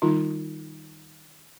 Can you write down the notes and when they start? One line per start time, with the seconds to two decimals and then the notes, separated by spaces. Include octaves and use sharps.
0.02 D#3 G3 D#4 F4